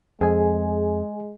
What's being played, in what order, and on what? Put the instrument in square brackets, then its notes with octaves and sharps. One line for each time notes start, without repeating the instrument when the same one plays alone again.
[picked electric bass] F2 [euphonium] G#3 [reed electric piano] G#4 G#5